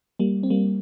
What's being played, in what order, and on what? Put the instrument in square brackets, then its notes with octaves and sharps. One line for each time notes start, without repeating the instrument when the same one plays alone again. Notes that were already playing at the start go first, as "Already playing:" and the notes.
[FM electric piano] G3 A#3
C4
G3 A#3